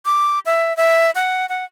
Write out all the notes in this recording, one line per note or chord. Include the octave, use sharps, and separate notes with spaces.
D6
E5
E5
F#5
F#5